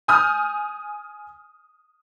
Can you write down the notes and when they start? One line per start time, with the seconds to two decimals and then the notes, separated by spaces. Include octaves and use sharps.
0.08 G#5 D#6 F6 G6